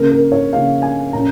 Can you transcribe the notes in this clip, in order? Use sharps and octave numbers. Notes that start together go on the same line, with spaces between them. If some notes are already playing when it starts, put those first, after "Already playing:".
Already playing: C#3 A#3 C#4 A#4
A#4
C#5
C#3 A#3 C#4 F5
G#5
A#2 A#3 C#4 A#5